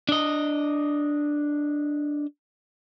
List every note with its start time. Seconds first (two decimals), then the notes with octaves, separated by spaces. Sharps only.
0.09 D4 D#5